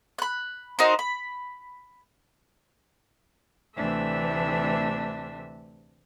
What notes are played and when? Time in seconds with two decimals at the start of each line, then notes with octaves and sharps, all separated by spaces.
0.19 B5 F#6
0.79 D#4 F#4 A#4 C5
0.99 B5
3.75 D2 C3 E3 A3 D4 E5